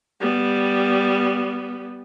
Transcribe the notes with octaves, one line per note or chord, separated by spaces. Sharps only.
G3 B3